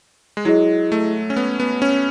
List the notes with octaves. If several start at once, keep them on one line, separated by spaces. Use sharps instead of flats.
G#3
F#3 E4 G#4 D#5
A3
C#4
B3
B3
C#4